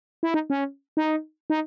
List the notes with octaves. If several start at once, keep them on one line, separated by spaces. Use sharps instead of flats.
E4
D#4
C#4
D#4
D#4